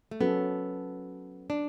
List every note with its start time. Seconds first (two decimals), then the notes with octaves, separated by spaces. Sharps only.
0.11 A3
0.21 F#3 B3 C#4 F#4 A4
1.50 D4